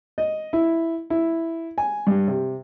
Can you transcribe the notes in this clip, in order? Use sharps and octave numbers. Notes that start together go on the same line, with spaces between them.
D#5
E4
E4
G#5
G2
C3